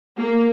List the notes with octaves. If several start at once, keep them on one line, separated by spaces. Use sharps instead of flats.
A#3